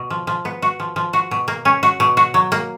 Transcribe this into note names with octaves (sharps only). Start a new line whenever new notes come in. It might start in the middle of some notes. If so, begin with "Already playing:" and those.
Already playing: B2
F3
F3
B3
F#4
F3
F3
F#4
B2
A#3
C#4
F#4
B2
F#4
F#3
A#3